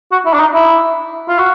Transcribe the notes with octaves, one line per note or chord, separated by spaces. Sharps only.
F#4
E4
D4
D#4
E4
F4
F#4